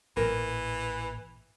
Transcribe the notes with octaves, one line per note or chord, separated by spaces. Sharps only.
A1 A#2 E3 A#4